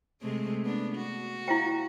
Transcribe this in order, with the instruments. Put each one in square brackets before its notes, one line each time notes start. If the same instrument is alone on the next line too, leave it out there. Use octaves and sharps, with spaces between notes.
[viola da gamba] C3 G#3 A3
B3 D4
F#4
[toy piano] E4 F5 G5